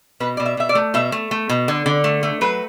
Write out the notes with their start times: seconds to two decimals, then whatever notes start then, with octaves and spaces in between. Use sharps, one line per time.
0.20 B2 B4
0.37 B2 D5
0.46 E5
0.57 B2 E5
0.69 D5
0.75 A3
0.94 B2 E5
1.12 A3
1.31 A3
1.49 B2
1.68 D3
1.86 D3
2.04 A3
2.23 A3
2.41 F#3 B4